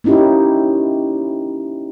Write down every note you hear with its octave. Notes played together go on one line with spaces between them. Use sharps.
A#3 C#4 D#4 E4 G4